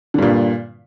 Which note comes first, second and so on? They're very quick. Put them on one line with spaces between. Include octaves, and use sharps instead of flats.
D3 G2 A#2